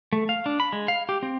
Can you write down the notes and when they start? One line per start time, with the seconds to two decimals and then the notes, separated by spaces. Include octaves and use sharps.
0.13 A3
0.29 F5
0.46 D4
0.60 B5
0.73 G#3
0.88 F5
1.09 G4
1.23 C4